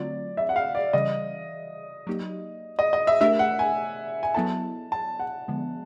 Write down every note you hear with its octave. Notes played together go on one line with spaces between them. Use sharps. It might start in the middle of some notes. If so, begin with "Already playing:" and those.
Already playing: D3 F#3 A3 C4 F4 D5
E5
F#5
F5
D5
C#3 E3 G3 D#5
F#3 A#3 D#4 G4
D#5
D#5
E5
A3 D4 G4 A#4 E5
F#5
G#5
G#5
F#3 B3 E4 A4 A5
A5
F#5
D3 F3 G#3 B3